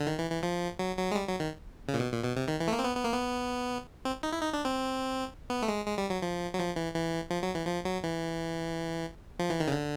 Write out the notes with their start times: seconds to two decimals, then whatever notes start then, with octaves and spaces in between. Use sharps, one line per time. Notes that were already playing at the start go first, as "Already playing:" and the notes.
0.01 D3
0.07 D#3
0.19 E3
0.31 E3
0.43 F3
0.79 F#3
0.97 F#3
1.11 G#3
1.15 G3
1.27 F#3
1.40 D#3
1.88 C#3
1.94 A#2
2.00 B2
2.12 A#2
2.24 B2
2.36 C3
2.48 D#3
2.60 E3
2.68 A3
2.72 A#3
2.79 C4
2.84 B3
2.96 B3
3.05 A#3
3.12 B3
4.05 C4
4.23 D#4
4.33 E4
4.41 D#4
4.53 D4
4.65 C4
5.50 B3
5.62 A3
5.68 G#3
5.86 G#3
5.98 G3
6.10 F#3
6.22 F3
6.54 F#3
6.58 F3
6.76 E3
6.95 E3
7.30 F3
7.43 F#3
7.55 E3
7.67 F3
7.85 F#3
8.04 E3
9.39 F3
9.50 E3
9.60 D#3
9.68 C#3
9.72 D3